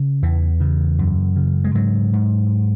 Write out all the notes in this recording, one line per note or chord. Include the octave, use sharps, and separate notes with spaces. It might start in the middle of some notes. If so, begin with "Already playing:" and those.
Already playing: C#3
E2 E3
C#3
F#2
C#3
G#3
G#2 F#3
G#2